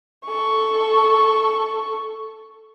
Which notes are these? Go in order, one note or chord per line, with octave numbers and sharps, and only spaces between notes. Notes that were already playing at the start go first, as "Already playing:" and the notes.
A4 C#6